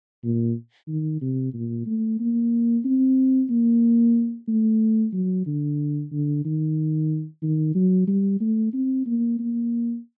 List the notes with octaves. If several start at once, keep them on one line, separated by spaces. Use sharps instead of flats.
A#2
D#3
C3
A#2
A3
A#3
C4
A#3
A3
F#3
D3
D3
D#3
D#3
F#3
G3
A3
C4
A#3
A#3